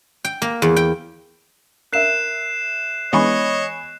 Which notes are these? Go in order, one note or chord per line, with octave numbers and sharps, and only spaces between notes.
G5
A#3
E2
G5
A#4 E5 F#6 C7 E7
E3 G#3 B3 C#5 D#5 G#5 B5 C#6